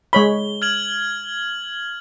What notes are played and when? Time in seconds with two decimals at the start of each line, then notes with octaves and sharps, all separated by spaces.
0.13 G#3 C#5 B5 G7
0.62 F6 G#6 F#7